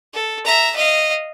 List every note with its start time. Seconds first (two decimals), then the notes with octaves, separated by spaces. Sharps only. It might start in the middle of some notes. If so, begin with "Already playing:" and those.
0.13 A4
0.45 E5 A#5
0.75 D#5 F5